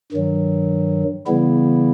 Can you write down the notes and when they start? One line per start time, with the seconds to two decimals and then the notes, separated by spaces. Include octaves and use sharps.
0.12 G2 D#3 F#3
1.27 C#3 E3 G3 B3 E4